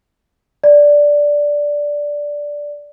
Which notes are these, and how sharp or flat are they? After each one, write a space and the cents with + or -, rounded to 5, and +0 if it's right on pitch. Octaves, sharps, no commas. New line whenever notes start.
D5 -5